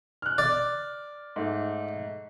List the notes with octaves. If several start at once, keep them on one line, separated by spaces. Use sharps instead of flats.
F6 F#6
D5
G#2 A3